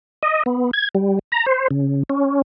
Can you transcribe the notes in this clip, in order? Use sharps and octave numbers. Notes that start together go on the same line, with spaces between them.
D#5
B3
G#6
G3
A#5
C5
C#3
C#4